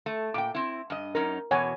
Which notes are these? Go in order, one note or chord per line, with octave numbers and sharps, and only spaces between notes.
A3
A#2 G5 D6
C4 E4
G2 D#5
F#2 C#4 D#4 A#4
E2 B2 C#5 F#5 G#5